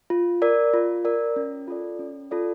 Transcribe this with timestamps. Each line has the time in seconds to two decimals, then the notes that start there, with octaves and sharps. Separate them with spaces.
0.10 F4
0.42 A#4 D5
0.74 F4
1.05 A#4 D5
1.36 C#4
1.68 F4 A4 D5
1.99 C#4
2.31 F4 A4 D5